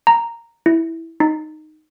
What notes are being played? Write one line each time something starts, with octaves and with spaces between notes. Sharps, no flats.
A#5
E4
D#4